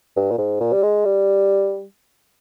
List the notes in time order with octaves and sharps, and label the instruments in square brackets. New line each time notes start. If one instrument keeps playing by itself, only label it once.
[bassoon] G2
A#2
G#2
A#2
G3
G#3
G3